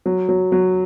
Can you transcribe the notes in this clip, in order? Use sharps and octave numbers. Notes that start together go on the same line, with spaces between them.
F#3
F#3
F#3